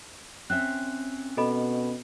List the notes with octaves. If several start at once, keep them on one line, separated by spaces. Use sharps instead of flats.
C4 C#4 E5 F#6
B2 A4 D#5 B5